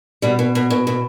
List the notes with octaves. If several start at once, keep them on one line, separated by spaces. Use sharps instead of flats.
B2 G3
B2
B2
B2
B2